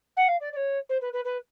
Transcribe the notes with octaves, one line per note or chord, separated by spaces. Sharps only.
F#5
F5
D5
D5
C#5
C5
B4
B4
B4